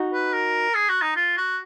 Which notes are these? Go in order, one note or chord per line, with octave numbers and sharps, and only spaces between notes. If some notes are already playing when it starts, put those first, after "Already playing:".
Already playing: D#4 F#4
B4
A#4
G#4
F#4
D#4
F4
F#4